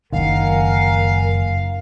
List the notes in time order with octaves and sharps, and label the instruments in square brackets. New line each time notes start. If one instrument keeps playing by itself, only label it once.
[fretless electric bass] F#1 D#3 [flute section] A#4 F#5 G#5 [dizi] F5